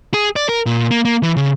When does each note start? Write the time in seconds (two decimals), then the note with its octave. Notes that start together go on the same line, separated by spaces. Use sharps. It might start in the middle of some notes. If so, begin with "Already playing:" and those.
0.14 G#4
0.36 D5
0.49 A#4
0.66 A#2
0.91 A#3
1.05 A#3
1.23 E3
1.37 C#3